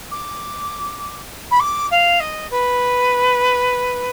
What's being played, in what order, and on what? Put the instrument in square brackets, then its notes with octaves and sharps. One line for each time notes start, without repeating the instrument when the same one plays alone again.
[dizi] D6
B5
D6
F5
D#5
B4